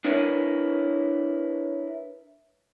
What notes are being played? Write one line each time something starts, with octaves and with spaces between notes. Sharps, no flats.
D4 E4 A#4 B4 C#5